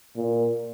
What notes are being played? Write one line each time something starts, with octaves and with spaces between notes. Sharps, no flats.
A#2